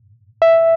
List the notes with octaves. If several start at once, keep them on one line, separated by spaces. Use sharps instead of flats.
E5